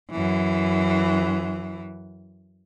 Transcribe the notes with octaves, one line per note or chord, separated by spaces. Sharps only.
F#2 E3